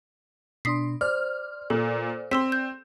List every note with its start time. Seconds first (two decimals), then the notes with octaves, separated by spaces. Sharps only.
0.65 B2 D4 C6 D#6 B6 C7
1.01 C5 D5 F6
1.70 A#2 A4
2.31 C4 C6 E6 B6
2.52 G6